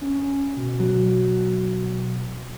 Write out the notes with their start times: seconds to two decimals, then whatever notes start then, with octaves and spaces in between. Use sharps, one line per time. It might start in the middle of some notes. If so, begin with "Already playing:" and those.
0.01 C#4
0.57 B2
0.80 F#3